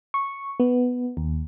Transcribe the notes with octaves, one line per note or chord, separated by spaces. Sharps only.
C#6
B3
D#2